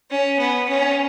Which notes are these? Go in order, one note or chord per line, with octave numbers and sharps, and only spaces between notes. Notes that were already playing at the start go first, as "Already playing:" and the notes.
C#4
B3
C#4